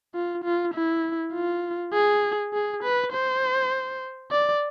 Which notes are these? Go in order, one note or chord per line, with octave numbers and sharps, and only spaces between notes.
F4
F4
E4
F4
G#4
G#4
B4
C5
D5